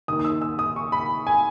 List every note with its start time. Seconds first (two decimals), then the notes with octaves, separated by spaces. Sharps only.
0.08 D#2 D#6
0.12 D#3
0.19 D#6
0.25 E6
0.42 E6
0.59 D#6
0.76 C#6
0.92 B5
1.27 G#5